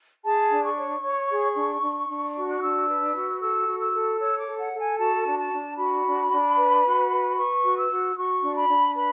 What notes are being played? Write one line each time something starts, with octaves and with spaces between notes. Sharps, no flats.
G#4 A5
D4
C#6
C#5
C#5
G#4
D4
D4
D4
F#4
F#6
D4 E6
B4
F#4
A4 E6
F#4
E6
A4
C#5 E6
D6
A4
F#5
A4
G#5
F#4 A5
D4
A5
D4
F#4 B5
D4
D4
B4
F#4
B4
B4 C#6
F#4
E6
F#4
F#4 C#6
D4
B5
D4
B4 B5